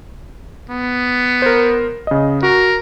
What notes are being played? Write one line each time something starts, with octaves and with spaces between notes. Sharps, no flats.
B3
A#4 C5
C#3 D#5
F#4 A#4